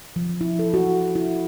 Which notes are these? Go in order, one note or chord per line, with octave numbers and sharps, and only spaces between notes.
F3
E4
A4
F#4
E4